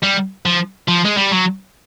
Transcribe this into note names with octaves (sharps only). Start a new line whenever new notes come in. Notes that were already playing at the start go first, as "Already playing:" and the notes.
G3
F3
F3
G#3
G3
F#3